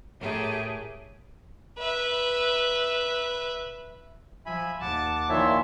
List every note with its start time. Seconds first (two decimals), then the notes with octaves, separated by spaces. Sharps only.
0.21 A2 A3 G4 G#4 A#4 C#5
1.78 B4 E5
4.46 F3 E5 G#5 B5
4.81 D#2 F#5 A5 D6
5.29 A#2 D#3 F3 E4 C#5 E5 A5 C6